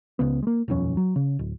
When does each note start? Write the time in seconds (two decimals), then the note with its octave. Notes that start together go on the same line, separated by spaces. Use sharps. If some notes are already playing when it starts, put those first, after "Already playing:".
0.19 C#2 C#3 B3
0.43 G#3 A#3
0.68 D#1 B1 F2 C#4
0.97 F#3
1.16 C#3
1.39 D1